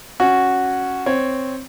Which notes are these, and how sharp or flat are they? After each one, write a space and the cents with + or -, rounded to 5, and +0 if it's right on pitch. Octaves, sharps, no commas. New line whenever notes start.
C#4 +0 F#4 +0
C4 +0 C#5 +0